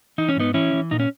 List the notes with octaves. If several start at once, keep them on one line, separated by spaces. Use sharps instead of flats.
E3 D#4
C#4
G#2 B3 D#4
E3 C#4 E4
E3
A#2 D#4
C#4